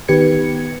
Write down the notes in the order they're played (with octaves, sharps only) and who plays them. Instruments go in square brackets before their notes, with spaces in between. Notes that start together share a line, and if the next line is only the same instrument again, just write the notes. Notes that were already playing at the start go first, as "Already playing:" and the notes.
[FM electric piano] D#3 B3 G4 B4 G#6 C#7